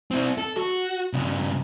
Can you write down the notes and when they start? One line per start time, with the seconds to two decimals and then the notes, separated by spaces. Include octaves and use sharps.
0.11 C4 E4
0.38 A4
0.57 F#4
1.13 G2 C#3